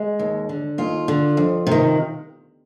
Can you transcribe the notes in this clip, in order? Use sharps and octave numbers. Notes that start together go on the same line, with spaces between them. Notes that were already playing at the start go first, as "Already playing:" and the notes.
Already playing: G#3
D#2
D3
D#2 F4
D3
F2
C3 D#3